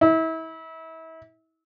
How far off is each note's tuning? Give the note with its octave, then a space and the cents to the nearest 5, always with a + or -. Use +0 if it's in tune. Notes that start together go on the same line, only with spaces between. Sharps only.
E4 -35